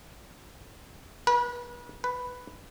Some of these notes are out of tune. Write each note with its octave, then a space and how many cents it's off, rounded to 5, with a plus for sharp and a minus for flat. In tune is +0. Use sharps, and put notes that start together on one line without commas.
B4 -35
B4 +5